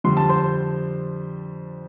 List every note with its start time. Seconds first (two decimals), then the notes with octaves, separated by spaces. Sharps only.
0.04 F2 D3 G3 C6
0.17 A5
0.29 C5 C6